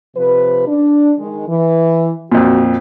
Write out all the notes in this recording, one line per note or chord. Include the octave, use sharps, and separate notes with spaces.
C3 F3 B4
D4
D#3 G#3
E3
F2 A#2 F#4